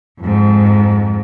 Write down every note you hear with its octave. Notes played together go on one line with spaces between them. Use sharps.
F2 G#2